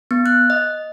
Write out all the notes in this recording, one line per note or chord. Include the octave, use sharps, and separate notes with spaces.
B3
F#6
D#5